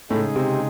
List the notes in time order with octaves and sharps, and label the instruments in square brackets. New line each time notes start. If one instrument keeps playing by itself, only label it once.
[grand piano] A2 A3 [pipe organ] C#3 G#3 D#4 G#4
[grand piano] C3 C4